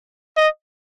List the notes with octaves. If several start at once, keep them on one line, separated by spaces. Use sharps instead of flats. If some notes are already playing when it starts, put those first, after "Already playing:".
D#5